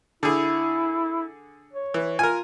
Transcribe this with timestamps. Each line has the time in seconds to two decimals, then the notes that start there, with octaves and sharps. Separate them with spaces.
0.23 D3 E4 G#4
1.73 C#5
1.94 E3
2.19 F4 A#4 G#5